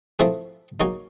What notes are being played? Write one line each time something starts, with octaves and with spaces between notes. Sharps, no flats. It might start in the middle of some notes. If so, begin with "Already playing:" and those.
F3 A3 C4 E4 G#4
F#3 A#3 D#4 G#4 C#5